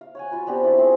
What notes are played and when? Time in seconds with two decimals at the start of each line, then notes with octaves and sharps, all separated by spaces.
0.01 F5
0.15 C#5 F#5 G#5
0.31 F4 F#4 B4
0.47 B3 C4 D4 G4
0.64 A3 D4 E4 D5
0.77 F3 C4 G#4 C#6